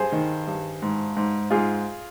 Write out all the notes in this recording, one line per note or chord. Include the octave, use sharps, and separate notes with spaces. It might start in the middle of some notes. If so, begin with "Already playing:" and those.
Already playing: G2 G#4 C5
D#3
G2
G#2
G#2
G#2 F4 G#4